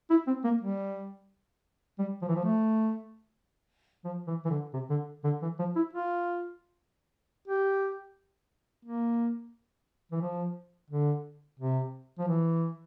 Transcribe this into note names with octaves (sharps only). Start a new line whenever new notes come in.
E4
C4
A#3
G3
G3
F3
E3
F3
A3
F3
E3
E3
D3
C3
D3
D3
E3
F3
E4
F4
G4
A#3
E3
F3
D3
C3
F3
E3